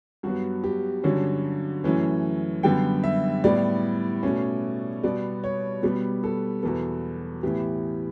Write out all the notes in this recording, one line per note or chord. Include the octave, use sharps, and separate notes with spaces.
G2 F#3 B3 F#4
G4
G2 D3 F#3 C#4
F#2 E3 A3 C#4
F#2 D3 G3 B3 G5
E5
A2 G3 B3 D5
B2 A3 C#4
B2 G3 B3 D5
C#5
B2 G3 B3 G4
A4
E2 B2 F#3 B3 A4
A2 E3 B3 G4